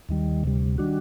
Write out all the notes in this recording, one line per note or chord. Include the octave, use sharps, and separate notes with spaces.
D#2 D#3 G3
D2 C3 G3
D#3 G3 D4 F#4